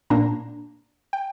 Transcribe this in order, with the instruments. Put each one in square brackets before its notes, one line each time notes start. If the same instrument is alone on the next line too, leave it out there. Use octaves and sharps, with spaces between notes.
[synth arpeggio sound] A#2 A#3 D4 A#5
G5